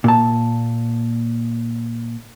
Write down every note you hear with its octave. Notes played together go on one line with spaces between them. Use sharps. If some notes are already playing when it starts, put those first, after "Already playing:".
A#2 A5